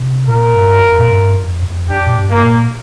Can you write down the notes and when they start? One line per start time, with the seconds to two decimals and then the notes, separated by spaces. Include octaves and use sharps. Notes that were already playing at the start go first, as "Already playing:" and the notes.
Already playing: C3
0.27 A#2 F4 A#4
0.55 G2
0.81 F2
0.99 A#2
1.08 G2
1.35 F2
1.63 F2
1.89 F2 D4 G4
2.07 A#2
2.17 G2
2.30 A#3
2.43 A#2